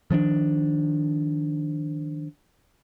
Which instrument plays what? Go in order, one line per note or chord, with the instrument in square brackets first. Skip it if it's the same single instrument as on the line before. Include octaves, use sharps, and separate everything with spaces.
[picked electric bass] D#3 F3 C#4 D4